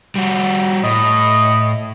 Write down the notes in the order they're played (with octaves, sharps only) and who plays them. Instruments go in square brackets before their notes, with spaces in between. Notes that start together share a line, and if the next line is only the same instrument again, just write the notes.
[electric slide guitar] G3 F#4
[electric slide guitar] A2 [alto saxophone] D#5